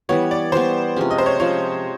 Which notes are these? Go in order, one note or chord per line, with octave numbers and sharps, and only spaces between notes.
E3 G3 B3 C#5
D5
E3 G3 B3 C5
C3 F3 G#3 C#4
D#5
C5
C#5
C3 F3 G#3 C#4 C#5